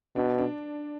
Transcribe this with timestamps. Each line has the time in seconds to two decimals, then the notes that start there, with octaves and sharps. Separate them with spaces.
0.16 B2 D4
0.38 D4